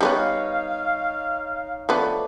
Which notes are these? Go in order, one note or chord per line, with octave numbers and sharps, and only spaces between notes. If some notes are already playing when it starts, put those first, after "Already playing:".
G3 G#3 B3 D#4 C#5 F5
F3 A3 B3 D4